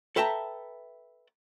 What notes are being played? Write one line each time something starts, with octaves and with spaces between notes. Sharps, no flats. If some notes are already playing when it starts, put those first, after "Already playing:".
A4 B4 E5 G5 A5 A#5